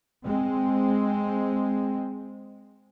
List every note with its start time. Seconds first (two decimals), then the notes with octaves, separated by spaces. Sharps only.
0.24 G#3 C4